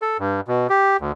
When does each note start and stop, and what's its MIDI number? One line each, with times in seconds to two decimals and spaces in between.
0.02 0.17 69
0.19 0.41 43
0.48 0.67 47
0.70 0.97 67
1.00 1.12 38